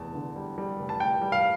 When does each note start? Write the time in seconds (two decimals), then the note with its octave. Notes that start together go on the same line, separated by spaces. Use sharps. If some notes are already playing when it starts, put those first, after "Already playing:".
Already playing: F1 E2 A5
0.15 D3
0.36 G3
0.58 G3
0.79 F1
0.89 A5
1.00 F1 G5
1.22 G3
1.32 F5